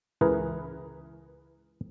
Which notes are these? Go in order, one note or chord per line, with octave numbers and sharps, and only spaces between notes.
C#2 E3 G#4 A#4 B4